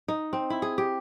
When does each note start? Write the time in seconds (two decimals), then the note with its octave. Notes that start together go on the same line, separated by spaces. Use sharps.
0.08 D#4
0.33 C4
0.50 E4
0.62 G#4
0.78 G4